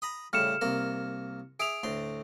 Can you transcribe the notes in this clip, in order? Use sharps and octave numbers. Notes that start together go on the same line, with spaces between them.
A#5 B5 D#6
A2 C#3 G3 F6 C#7 E7
C2 A#3 A#4
G#4 E5 D6 D7 F7
D2 A2 C6